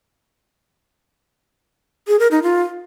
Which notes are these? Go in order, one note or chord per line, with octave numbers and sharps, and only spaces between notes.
G#4
A#4
D#4
F4